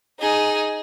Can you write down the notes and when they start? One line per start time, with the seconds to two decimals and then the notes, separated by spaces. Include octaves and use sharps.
0.20 D#4 G#4